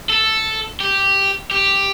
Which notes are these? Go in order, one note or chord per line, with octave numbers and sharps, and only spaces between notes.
A4
G4
G4